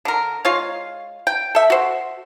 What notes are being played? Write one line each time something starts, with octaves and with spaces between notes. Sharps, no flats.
D3 A#4
G#3 F4 C#5 F5
G5
A4 E5
F#4 C5